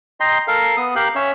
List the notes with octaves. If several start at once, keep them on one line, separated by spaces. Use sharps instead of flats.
D#5 G5 A#5 C6
A4 A#4 F5
B3 D#6
G4 A#4 F5 G5 F#6
C#4 C#5 E5